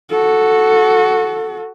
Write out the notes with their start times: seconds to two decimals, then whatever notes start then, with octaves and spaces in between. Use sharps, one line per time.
0.11 F#4 A4